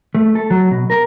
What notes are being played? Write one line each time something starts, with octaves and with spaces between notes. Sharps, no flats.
A3
A4
F#3
B2
A#4